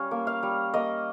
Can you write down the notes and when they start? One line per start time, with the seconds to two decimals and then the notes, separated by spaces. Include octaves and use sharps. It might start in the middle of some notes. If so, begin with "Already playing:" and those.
Already playing: G3 C#4 C#5 F5
0.11 A#3
0.27 F5
0.43 G3
0.74 A#3 D#5